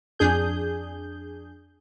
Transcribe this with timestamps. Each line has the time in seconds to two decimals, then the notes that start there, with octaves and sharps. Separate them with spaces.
0.19 F2 D4 G#4 G6